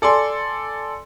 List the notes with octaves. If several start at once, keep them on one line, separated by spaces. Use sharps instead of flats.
A4 D5 G#5 C6